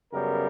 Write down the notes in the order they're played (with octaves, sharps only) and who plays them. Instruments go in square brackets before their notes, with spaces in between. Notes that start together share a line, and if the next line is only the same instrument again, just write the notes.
[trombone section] F#2 C#3 G3 B3 A#4